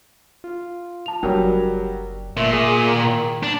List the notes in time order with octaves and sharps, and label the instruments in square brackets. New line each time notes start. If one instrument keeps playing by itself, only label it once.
[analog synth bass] F4
[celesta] A5 F7
[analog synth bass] F#1 [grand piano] F#3 G3 [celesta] D4 A#4 G5
[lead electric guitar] A#2 [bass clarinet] A3
[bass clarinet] G#4
D#3
[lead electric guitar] D4